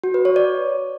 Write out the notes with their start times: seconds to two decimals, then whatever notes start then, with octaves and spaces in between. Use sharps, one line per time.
0.04 F#4
0.14 B4
0.25 C#5
0.36 D5